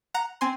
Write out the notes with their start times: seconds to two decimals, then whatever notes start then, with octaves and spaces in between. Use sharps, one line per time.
0.14 F#5 A#5
0.41 C4 G#5 C6